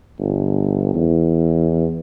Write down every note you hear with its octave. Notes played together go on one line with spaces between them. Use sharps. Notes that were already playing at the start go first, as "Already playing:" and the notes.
G1
E2